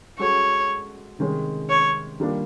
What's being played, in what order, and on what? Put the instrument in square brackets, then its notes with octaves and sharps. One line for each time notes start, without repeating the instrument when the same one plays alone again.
[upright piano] G#3 C#4 F#4 A4 [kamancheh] C#5
[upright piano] C3 D#3 G#3 C#4
[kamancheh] C#5
[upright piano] D#3 G3 A#3 D4 F4